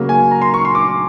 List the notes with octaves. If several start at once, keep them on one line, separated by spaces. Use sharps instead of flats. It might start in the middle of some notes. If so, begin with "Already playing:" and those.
Already playing: C#3 F#3 A#3
G#5
A#5
C6
C#6
C6
D6